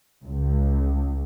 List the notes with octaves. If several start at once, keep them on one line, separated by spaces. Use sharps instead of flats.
C#2